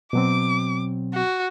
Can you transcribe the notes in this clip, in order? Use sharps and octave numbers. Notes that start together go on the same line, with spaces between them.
B2 F#3 C4 D6
F#4